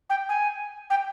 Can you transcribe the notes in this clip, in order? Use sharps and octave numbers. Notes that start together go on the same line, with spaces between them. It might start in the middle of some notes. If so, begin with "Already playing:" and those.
G5
G#5
G5